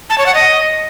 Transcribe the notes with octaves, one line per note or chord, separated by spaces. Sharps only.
A5
C#5
F#5
D#5